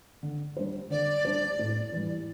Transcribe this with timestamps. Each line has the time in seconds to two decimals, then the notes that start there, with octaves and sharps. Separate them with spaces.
0.23 D3
0.57 G3 D4 C5
0.90 D3 D5
1.25 G3 D4 C5
1.59 A2
1.93 E3 G3